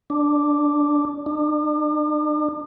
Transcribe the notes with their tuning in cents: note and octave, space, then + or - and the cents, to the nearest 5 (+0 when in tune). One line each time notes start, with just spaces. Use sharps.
D4 +0
D4 +45